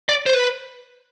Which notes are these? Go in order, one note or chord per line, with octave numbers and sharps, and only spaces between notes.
D5
C5
B4